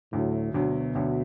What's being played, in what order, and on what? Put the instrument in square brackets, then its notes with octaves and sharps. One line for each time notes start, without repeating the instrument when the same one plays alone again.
[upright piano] D2 D3 F#3 [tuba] A2
[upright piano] D2 D3 F#3 [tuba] B2
[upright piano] D2 D3 F#3